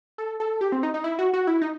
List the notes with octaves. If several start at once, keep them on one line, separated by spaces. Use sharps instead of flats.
A4
A4
G4
C4
D#4
D#4
E4
F#4
F#4
E4
D#4